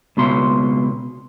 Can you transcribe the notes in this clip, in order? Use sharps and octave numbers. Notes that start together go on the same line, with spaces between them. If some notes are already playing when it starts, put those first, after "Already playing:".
C#2 B2 C6